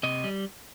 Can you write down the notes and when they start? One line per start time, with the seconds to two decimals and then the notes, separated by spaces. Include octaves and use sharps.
0.03 C3 D#5
0.24 G3